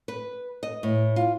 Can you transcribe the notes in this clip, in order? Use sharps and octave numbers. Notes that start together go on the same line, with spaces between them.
B4
D#5
A2
F4